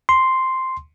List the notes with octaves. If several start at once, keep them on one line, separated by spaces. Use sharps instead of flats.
C6